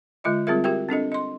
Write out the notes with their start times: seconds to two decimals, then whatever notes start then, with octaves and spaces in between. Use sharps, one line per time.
0.24 D3 G#3 F4 D#5 E5
0.47 G3 C4 F4 G#4 A#4 E5
0.64 F#4 G4 A#4 E5 G5
0.89 C4 D4 A4 D#5
1.12 D#5 C6